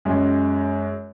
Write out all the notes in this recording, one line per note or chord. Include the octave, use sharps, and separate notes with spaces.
F#2 G#3